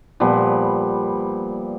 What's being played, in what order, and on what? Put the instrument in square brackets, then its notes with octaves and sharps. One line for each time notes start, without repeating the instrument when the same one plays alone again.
[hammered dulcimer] A#2 F3 G3 B3